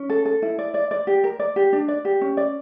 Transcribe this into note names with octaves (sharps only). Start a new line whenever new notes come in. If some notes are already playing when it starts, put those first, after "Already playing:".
Already playing: C#4
A4
A4
E4
D5
D5
D5
G4
A#4
D5
G4
D4
D5
G4
C#4
D5